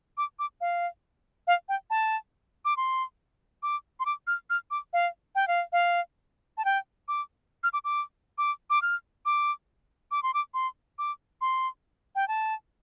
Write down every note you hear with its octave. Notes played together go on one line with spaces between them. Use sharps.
D6
D6
F5
F5
G5
A5
D6
C6
D6
C6
D6
F6
F6
D6
F5
G5
F5
F5
A5
G5
D6
F6
D6
D6
D6
D6
F6
D6
D6
C6
D6
C6
D6
C6
G5
A5